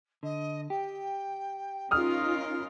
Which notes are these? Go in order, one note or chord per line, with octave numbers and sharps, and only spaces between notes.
D3 D#5
G4 G5
C#4 D#4 F4 A#4 D#6 F6